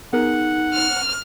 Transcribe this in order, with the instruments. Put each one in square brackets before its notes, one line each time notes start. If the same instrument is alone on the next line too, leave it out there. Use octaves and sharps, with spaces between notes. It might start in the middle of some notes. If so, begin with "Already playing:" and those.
[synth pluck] B3 G#4 A#4 [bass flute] D#4 [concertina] F#5
[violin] F6